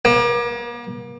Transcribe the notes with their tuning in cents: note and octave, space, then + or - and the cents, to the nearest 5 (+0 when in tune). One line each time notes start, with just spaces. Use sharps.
A#3 +40